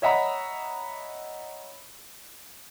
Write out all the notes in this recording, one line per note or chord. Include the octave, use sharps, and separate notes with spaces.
C#5 D#5 E5 F#5 A#5 B5